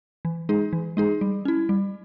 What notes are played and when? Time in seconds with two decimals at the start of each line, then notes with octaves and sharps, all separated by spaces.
0.25 E3
0.49 G#3 D#4 G#4
0.73 E3
0.97 G#3 D#4 G#4
1.21 G3
1.45 C#4 E4
1.69 G3